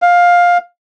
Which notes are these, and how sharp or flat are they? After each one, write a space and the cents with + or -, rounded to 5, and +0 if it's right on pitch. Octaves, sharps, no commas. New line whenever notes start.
F5 +15